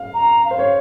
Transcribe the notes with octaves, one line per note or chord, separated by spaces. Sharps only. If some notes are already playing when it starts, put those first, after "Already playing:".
Already playing: F5
A#5
F5
C5
C#5